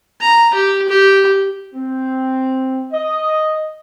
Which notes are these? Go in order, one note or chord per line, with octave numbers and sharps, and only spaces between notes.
A#5
G4
G4
C4
D#5